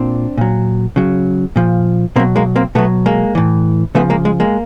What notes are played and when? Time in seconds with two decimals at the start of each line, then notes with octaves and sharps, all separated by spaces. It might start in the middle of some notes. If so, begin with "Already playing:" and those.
Already playing: A#2 C4 D4
0.37 A#2 F#3
0.96 C#3 F#3
1.56 A#2 F3
2.16 B2 A#3 C4
2.19 F#3
2.36 G#3 A#3
2.56 A#3 C4
2.75 B2 F#3 A3 B3
3.06 G#3 A#3
3.35 A2 E3
3.95 C#3 F3 A3 B3
4.10 G#3 A#3
4.25 G#3
4.40 G#3 A#3